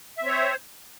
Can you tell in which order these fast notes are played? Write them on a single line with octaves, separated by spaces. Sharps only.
E5 C4 C#5 C5